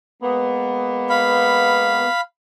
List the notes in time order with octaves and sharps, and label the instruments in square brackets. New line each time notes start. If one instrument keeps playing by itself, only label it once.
[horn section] G#3 A#3 B3
[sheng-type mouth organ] F5 B5